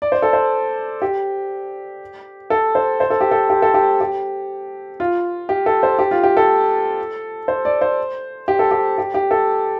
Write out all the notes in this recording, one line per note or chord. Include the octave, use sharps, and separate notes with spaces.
D5
C5
A4
C5
G4
A4
C5
C5
A4
G4
A4
G4
A4
G4
G4
F4
G4
A4
C5
G4
F4
G4
A4
C5
D5
C5
G4
A4
G4
G4
G4
A4